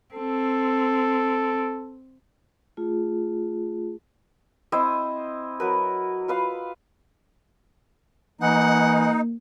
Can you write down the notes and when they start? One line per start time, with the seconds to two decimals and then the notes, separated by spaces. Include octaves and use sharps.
0.15 C4 A4
2.77 A3 F4 G#4
4.72 C4 E4 C5 D#5
5.60 F#3 A#4 B4
6.28 F4 B4 F5
8.41 E3 A#3 D#4 F#5